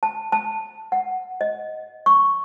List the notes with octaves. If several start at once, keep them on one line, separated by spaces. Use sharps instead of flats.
A5
A5
F#5
D#5
C#6